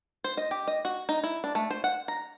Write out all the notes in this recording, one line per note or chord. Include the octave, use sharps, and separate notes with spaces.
C5
D#5
G4
D#5
F#4
D#4
E4
D4
A3
C5
F#5
A#5